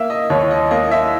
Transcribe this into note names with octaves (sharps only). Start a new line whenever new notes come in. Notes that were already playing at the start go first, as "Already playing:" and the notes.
Already playing: A#3 E5
D#5
D#2 C#5
C#5
D#5
A#3 D#5
E5